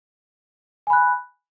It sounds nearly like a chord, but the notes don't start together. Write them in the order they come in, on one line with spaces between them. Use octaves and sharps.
G#5 B5 F#6